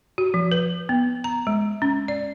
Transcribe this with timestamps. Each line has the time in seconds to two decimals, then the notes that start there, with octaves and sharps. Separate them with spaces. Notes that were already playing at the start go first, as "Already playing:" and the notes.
0.18 F#4
0.34 F3
0.52 B4
0.89 B3
1.24 A#5
1.47 G#3
1.82 C#4
2.08 D5